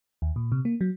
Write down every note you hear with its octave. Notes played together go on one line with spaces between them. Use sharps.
D#2
A#2
C3
A#3
F#3